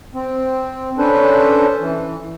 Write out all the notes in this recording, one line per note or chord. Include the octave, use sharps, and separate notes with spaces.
C4
C#4 D4 A4 B4 C5
E3